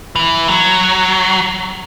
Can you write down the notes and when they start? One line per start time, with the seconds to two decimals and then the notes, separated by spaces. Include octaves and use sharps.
0.16 E3
0.48 F#3